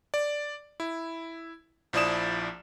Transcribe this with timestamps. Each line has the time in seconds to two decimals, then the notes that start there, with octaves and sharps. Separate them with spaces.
0.14 D5
0.80 E4
1.93 A#1 F3 E4 D5 D#6 E7